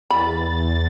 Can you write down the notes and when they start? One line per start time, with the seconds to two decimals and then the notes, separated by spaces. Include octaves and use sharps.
0.10 E2 B5 A6